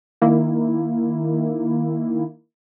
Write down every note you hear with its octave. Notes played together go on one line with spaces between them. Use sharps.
D#3 A#3 E4